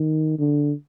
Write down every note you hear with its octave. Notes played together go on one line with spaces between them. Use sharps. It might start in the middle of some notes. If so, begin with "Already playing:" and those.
Already playing: D#3
D3